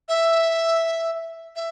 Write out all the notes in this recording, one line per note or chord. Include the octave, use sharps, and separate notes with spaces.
E5
E5